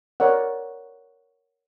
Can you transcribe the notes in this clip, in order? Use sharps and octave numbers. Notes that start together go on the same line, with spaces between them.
A#4 C#5 D5 F#5